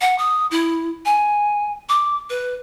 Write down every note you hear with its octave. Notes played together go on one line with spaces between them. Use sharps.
F#5
D#6
E4
G#5
D6
B4